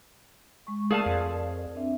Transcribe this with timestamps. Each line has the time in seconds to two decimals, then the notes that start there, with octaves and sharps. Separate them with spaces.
0.67 G#3 C#6
0.91 A3 G#4 A#4 D5 F5 A5
1.06 F2
1.75 C4 D4 E5